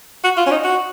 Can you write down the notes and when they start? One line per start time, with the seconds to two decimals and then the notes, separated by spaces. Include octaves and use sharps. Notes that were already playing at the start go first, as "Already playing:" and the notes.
0.24 F#4
0.37 F4
0.46 C#4
0.51 D#4
0.64 F#4